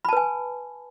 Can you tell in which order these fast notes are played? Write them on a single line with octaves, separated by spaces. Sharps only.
B5 A5 B4 G#5